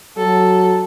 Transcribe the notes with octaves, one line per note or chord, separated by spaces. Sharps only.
F#3 A4